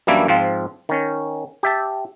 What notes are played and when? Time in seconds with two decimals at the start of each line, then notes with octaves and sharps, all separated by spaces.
0.07 F#2 E3 G3 A#3 D4 E4
0.28 G#2 F3 C4 F4
0.89 D#3 C#4
1.63 G4 E5 A5